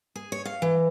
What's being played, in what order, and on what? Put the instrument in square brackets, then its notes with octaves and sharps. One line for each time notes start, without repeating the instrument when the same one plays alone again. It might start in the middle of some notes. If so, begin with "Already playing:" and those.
[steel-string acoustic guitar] G#4
C#5
F5
E3